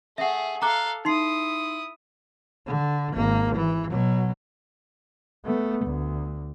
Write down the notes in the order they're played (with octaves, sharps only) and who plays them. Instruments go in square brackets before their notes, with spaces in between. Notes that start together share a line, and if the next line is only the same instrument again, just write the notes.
[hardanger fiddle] A3 G#4 [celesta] E5 F#5
[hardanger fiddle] A4 F5 [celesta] A#5 D6 F#6
[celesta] D#4 C6 C7 [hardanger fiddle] E4 D#6
[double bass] D3
G#1 A#3
E3
B2 F#3
A3 B3
D2